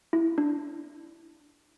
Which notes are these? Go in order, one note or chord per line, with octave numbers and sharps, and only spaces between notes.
E4
D4